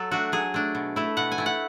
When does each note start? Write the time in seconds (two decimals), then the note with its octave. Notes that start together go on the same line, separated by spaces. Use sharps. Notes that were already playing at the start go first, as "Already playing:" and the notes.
Already playing: F#3 A4
0.11 A3 D4 F#4
0.32 F#3 G#4
0.54 A3 D4
0.75 B2
0.96 A3 E4
1.17 B2 F#5
1.32 G#5
1.38 A3 E4
1.46 F#5